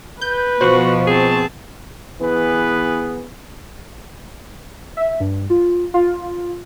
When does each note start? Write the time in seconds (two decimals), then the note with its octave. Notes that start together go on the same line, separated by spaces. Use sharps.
0.21 B4 G6
0.61 B2 F3 F#4 C5 C#6
1.07 C4 G#4 A5
2.22 E3 B3 G#4 B4
4.97 E5
5.20 G2
5.50 F4
5.94 F4